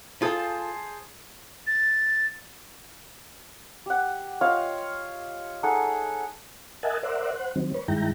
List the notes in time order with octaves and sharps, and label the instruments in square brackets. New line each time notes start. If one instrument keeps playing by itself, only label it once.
[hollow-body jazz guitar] F4 A4 [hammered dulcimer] G#4 C5 A5
[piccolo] A6
[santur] G4 F#5
F4 C#5 D#5 F5
D#4 G#4 A4 F#5
[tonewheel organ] A#4 D#5 E5 F#5 G#5 A5
A#4 C5 D5 E5 F#5
C5 F#5
D#3 F#3 C4
B4 C#5
G2 D#3 G#3 E4 G5 A#5